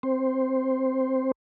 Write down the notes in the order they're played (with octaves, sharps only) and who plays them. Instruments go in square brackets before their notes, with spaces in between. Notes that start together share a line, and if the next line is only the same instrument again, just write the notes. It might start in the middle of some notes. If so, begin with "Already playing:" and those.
[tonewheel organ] C4 C5